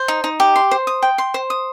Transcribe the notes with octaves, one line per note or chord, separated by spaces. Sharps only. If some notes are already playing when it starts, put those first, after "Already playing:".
Already playing: C5
D#4
D#4
G4
C6
C5
D#6
G5
C6
C5
D#6